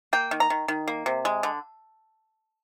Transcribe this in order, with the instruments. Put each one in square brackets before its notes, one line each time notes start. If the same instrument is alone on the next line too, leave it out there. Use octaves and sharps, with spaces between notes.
[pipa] A#3 G5
D#3
A#5
D#3
D#3
A#3
C3
G#3
D3